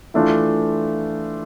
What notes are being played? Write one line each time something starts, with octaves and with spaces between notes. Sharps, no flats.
E3 A3 D4 F4